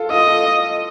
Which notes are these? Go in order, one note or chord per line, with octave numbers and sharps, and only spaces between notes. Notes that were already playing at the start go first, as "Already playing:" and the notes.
Already playing: F4 A4
F4 A4 D#5